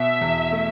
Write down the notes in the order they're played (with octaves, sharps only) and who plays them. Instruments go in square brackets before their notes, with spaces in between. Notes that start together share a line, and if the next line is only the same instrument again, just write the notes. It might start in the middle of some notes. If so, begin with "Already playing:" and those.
Already playing: [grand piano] B2 [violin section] E5
[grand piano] E2
A3